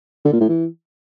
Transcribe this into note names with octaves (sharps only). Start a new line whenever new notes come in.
D3
A#2
A2
E3